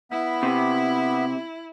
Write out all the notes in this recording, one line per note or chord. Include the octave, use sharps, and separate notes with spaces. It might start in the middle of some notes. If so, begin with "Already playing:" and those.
B3 E4 E5
C3